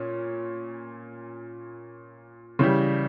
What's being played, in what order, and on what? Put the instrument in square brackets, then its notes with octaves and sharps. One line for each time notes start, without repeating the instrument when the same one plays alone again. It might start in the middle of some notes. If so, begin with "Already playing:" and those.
Already playing: [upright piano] A#2 C#4
C#3 E3 G3